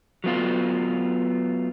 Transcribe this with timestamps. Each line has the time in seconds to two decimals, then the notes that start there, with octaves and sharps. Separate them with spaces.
0.24 F#3 A3 B3 F4